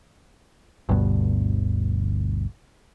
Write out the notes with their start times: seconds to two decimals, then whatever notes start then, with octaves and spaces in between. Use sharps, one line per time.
0.89 G1 D2 G2 B2